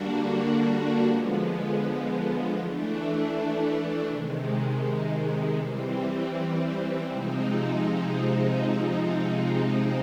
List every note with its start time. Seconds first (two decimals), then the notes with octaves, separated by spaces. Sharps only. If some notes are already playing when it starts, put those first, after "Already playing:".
Already playing: D3 G3 A#3 D4 F#4
1.05 D3 F3 G#3 B3
2.56 E3 A3 D4
4.07 C3 D#3 G#3
5.58 E3 G3 C4
7.09 C3 F3 G#3 C4 D#4